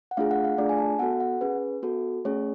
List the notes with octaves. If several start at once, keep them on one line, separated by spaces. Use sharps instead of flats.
F#5
A3 D4 F4 G#4 F5
F#5
F5
A3 D4 F4 G#4 D5
G#5
A5
B3 F#4 A4 F#5
F#5
C#4 G#4 B4
B3 F#4 A4
A3 C#4 G#4 C#5